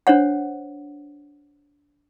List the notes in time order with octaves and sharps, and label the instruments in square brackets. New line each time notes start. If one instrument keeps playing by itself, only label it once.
[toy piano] D4 C5 C#5 F#5